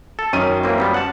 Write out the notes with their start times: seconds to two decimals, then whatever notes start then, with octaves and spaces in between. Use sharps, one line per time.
0.19 A4
0.33 F#2 D#3 C#4 D#7
0.64 E3 A#3 C4
0.78 F3 G3 B3
0.94 F#5 A5